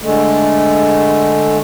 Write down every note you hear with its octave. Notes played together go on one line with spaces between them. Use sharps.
D3 G#3 A3